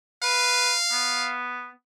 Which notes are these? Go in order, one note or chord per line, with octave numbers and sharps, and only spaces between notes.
B4 F5
B3